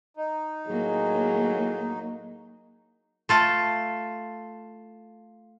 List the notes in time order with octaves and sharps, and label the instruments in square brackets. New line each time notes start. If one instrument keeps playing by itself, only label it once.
[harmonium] D#4
[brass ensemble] A2 G#4 [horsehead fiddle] F#3 A#3
[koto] A3 F4 A4